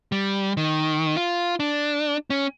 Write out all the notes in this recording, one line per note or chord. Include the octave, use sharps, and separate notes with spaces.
G3
D#3
F4
D4
C#4